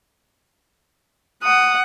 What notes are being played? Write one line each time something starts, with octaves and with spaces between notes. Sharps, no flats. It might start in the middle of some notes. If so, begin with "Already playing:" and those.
F#5 D#6